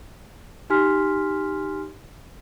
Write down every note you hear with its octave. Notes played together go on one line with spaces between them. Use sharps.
D#4 G4 G#5 C6 F6 B6